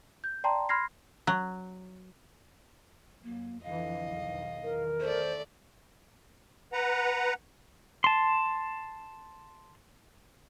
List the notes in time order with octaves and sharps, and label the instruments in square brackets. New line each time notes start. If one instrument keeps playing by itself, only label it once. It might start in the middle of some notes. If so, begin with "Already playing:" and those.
[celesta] G6
D5 G5 A5 A#5 C6
B5 C6 F6 G#6 A#6 C7
[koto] F#3
[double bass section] F#2 [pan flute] A#3
[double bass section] F2 D3 E3 [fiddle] D#5 [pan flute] F5
[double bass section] B1 E2 D#3
[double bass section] E2 D#3 [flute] A#4
[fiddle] A3 D5 [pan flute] C5
[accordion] B4 F#5 A#5
[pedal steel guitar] A5 C6